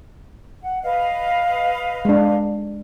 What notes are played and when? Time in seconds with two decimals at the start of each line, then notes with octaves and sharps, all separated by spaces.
0.64 F#5
0.83 B4 D#5 F5
2.05 G#3 D4